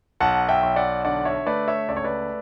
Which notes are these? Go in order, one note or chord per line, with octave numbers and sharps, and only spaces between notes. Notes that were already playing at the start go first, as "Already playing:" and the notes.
B1 F#5 A5
E5 G5
B1
D5 F#5
D3 D5 F#5
C#5 E5
A3 B4 D5
C#5 E5
C#2 D5
C#5
B4 D5